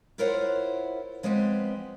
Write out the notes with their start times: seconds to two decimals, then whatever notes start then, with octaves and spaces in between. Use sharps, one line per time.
0.18 E4 F4 A#4 C5 C#5 F#5
1.23 F3 G#3 B3 C4 G4